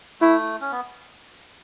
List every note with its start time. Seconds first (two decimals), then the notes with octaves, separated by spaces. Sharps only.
0.20 A3 E4
0.61 C#4
0.72 B3